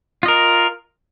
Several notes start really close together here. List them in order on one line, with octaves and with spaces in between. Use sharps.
F4 D#5 A#4